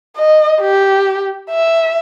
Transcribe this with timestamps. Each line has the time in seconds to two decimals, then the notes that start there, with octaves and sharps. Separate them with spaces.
0.16 D#5
0.61 G4
1.51 E5